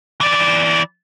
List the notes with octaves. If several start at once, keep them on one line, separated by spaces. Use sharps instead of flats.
E3 D5